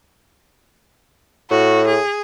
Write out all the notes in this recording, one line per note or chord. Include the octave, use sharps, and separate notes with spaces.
A2 F#4
G#4